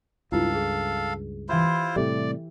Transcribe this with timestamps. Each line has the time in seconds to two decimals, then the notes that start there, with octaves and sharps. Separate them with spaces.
0.32 C#2 G2 E4 F4 A4 F5
0.55 G#4
1.49 E3 E4 F4 G4 C5 E5 B5
1.96 A2 C3 G3 A4 D5